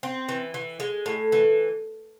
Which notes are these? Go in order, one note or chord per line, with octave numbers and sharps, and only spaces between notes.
C4
E3
E3
G#3
A2
E3